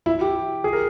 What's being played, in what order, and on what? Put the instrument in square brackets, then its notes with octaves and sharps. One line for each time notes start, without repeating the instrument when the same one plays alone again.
[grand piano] E4
G4
G#4
A#4